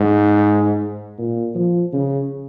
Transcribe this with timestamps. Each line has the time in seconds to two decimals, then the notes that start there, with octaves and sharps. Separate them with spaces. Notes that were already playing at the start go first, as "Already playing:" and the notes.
Already playing: G#2
1.18 A#2
1.55 F3
1.93 C#3